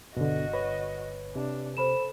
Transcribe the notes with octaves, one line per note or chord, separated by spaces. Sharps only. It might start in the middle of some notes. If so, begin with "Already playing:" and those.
G1 B2 D3 F#4 D#5
B4 C#5
C3 D4
A4 C5 B5 E7